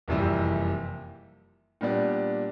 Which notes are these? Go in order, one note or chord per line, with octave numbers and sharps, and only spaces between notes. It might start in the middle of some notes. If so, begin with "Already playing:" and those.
F#1 F2 C3 E3 G3
A#2 G3 B3 D4